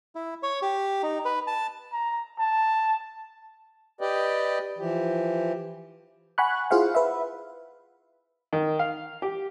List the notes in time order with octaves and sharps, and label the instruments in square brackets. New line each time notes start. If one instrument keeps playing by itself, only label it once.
[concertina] E4
C#5
G4
D#4
B4
A5
[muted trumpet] A#5
A5
[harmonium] G4 B4 D5 D#5 G5
E3 F3 G4
[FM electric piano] F#5 G#5 B5 C#6 F#6
E4 F4 G#4 C5 F5 F#5
B4 E5
[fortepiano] D#3
F5
G4